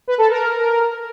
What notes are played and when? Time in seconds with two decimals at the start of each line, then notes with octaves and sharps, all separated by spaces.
0.08 B4
0.18 A4
0.28 A#4